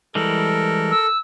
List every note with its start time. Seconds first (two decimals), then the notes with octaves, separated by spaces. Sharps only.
0.15 E3 G3 G#3 A4 A#4
0.91 E6